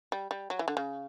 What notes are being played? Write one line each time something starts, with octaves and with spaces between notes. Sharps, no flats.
G3
G3
F#3
E3
D3
C#3